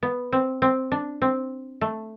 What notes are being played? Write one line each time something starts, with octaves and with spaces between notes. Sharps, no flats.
B3
C4
C4
D4
C4
A3